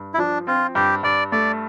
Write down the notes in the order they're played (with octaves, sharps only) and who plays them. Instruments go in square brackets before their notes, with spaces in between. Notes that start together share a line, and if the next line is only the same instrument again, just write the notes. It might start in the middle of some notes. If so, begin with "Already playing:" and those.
Already playing: [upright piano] G2
[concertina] E4
[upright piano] F3 [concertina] D4
[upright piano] C4 [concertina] F4
[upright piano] G2 [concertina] G4
[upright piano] G2 [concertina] D5
[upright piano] A3 [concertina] D5